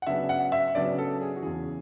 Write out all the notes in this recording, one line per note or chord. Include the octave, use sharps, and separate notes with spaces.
F#5
C#3 F#3 B3 D4 E5
F#5
E5
C#3 F#3 B3 D4 D5
A4
G#4
F#4
E2 C#3 E3 G#4